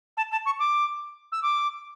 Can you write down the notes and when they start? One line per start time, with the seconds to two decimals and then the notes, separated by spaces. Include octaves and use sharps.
0.17 A5
0.32 A5
0.46 C#6
0.59 D6
1.32 E6
1.43 D6